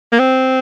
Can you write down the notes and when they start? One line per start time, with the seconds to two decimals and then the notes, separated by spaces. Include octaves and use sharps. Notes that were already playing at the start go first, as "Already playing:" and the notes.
0.12 A#3
0.19 C4